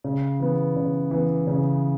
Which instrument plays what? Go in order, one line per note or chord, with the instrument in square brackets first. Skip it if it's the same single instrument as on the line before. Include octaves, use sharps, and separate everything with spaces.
[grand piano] C#3
E3 B3
C#3
E3 B3
C#3